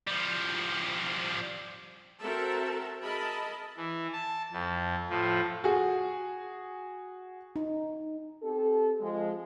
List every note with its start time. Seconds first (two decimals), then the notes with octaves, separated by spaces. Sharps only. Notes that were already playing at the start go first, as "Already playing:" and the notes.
0.07 F3 G3
2.19 C4 F#4 A4 A#4 E5 A5
3.02 G#4 A#4 D#5 E5 A5 B5
3.77 E3
4.13 A5
4.52 F2
5.10 A2 F3
5.64 F#4 G#4
7.56 D#4
8.43 C4 G4 A4
9.00 F3 G#3